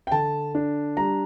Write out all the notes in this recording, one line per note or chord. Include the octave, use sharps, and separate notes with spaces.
G5
D3 A5
D4
G3 A#5